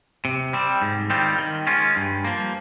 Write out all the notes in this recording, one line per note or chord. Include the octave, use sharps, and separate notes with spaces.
C3
G3 C4
G#2
D#3 G3 C4 F4
D#3
G#3 C#4 F4
G2
F3 A#3